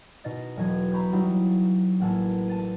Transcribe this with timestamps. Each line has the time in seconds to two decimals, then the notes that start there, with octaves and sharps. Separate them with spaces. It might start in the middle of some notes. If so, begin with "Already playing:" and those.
0.24 B2 D#4 D#5 A6 A#6
0.57 E1 F#3 D#5 G#6
0.92 A#5 B5 C#6 G6
1.13 F#3 G3 B3 D#4 E4
2.00 A1 A#3 F#5 G#5 A5 E6
2.47 A5 A6 D#7